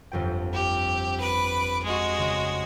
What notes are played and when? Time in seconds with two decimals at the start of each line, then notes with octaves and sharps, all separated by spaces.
0.12 G1 F2 G5
0.52 G4
1.19 B4 D6
1.82 G#3 F#4
2.18 C#3